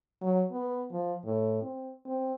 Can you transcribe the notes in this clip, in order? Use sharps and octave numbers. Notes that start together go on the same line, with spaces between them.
F#3
B3
F3
A2
C4
C4